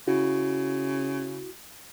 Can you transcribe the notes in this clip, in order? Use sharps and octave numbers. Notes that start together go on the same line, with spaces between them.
C#3 E4 F#4